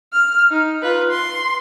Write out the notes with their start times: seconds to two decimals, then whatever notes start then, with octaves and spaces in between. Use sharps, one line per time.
0.13 F6
0.51 D#4
0.82 F4 B4
1.11 C6